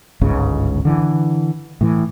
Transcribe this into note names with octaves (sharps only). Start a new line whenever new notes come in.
G1 C#2 G#2 C#3
D3 E3
A2 E3